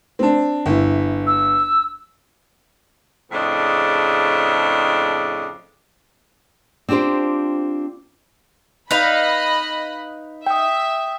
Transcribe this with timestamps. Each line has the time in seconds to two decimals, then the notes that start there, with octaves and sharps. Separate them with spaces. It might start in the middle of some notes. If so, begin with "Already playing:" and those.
0.19 C4 D4
0.66 G1 E4
1.27 E6
3.32 F2 A2 C#3 D4 G#4 D#5
6.89 C4 D4 F4 G4 C5
8.91 D#4 B4 D#5 F5 B5 F#6
10.47 E5 G5 D#6